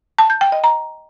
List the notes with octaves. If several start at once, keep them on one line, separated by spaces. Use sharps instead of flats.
A5
G6
G5
D#5
A#5